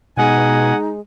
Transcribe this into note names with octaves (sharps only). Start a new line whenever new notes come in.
B2 G#3 D#4 D#5 F#5 G#5